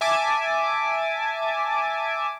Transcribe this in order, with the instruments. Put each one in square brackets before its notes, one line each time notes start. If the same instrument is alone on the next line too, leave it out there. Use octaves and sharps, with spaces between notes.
[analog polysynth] E5 G#5 A5 D6